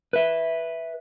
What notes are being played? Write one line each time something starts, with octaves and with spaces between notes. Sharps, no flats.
B4 E5